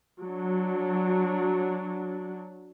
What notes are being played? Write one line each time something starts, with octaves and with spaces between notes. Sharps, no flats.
F#3 D4